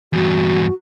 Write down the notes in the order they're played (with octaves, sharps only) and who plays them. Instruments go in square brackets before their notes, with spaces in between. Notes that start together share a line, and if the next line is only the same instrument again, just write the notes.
[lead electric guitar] E2 G2 [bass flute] F#4